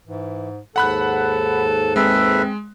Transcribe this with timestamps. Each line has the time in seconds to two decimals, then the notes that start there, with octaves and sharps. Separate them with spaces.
0.07 G#2 E3
0.76 D#2 G#2 A4 F#5 B5 F#6
1.96 G#3 C4 A4 B4 E5